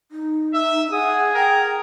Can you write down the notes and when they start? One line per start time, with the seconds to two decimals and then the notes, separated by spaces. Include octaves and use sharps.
0.12 D#4
0.54 E5
0.92 G#4 F#5 D#6
1.35 A#4 G5